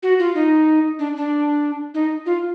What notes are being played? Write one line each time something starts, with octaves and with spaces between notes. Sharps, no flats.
F#4
F4
D#4
D4
D4
D#4
F4